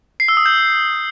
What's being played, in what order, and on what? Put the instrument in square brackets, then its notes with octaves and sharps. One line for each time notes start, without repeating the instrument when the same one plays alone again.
[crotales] C7
E6
D#6
G6